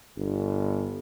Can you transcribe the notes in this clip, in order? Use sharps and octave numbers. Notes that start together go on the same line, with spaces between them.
G1